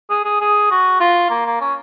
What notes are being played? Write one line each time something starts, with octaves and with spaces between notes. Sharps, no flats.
G#4
G#4
G#4
F#4
F4
A#3
A#3
C#4